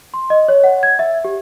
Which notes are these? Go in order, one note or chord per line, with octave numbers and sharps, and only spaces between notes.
C6
D#5
C#5
F#5
G#6
E5
G4